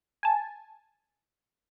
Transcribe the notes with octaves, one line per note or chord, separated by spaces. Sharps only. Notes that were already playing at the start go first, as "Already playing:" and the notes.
G#5 A5